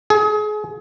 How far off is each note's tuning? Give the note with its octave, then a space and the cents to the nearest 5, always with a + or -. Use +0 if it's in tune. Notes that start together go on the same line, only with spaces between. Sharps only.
G#4 +30